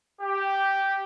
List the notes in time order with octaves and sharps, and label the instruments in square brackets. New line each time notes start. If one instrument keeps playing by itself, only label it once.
[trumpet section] G4